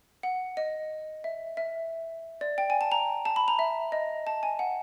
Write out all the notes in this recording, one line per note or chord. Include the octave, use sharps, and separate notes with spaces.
F#5
D#5
E5
E5
D5
G5
G#5
A5
A#5
A5
B5
A#5
E5
D#5
A5
G#5
F#5